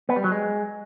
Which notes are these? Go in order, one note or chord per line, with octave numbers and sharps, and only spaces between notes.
B3
G3
F#3
G#3